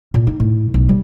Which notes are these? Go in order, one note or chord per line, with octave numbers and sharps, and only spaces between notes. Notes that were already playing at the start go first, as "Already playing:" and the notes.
A#2
D#4
A2
B1
G3